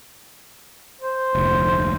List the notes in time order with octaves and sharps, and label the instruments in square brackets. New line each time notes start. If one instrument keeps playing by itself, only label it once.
[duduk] C5
[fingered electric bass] F1 D2